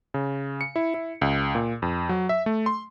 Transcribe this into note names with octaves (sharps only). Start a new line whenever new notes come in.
C#3
C#7
E4
E4
C#2
A#2
F2
F#3
E5
A3
C6